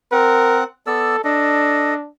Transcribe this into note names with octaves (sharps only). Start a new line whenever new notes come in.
C4 A#4 F#5
B3 A4 D5 E6
D4 A4 D#5